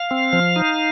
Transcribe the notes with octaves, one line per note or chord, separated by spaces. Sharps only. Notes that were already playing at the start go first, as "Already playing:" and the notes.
Already playing: F5
C4
F3
D#4